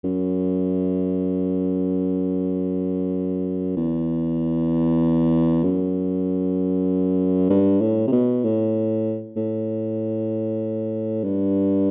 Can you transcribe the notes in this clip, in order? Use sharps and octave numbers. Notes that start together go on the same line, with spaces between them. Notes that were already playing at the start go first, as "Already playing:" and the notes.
F#2
E2
F#2
G2
A2
C3
B2
A2
A2
G2